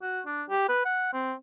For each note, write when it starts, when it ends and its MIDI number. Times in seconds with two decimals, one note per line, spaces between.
0.02 0.21 66
0.26 0.43 62
0.49 0.65 67
0.69 0.83 71
0.85 1.09 78
1.14 1.34 60